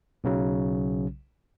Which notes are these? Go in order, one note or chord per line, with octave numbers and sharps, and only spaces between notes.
B1 C#3 F#3